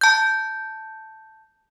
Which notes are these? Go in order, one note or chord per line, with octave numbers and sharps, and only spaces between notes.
A5 G6